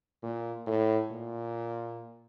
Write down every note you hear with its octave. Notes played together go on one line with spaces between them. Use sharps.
A#2
A2
A#2